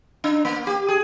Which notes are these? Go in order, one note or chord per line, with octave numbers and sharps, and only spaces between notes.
D4
A#3
G4
G#4